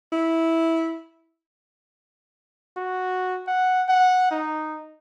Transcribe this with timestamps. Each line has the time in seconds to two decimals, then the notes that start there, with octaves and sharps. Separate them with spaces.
0.12 E4
2.77 F#4
3.47 F#5
3.89 F#5
4.31 D#4